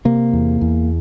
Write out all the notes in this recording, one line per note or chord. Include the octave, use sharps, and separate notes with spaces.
C3 A#3
E2
E2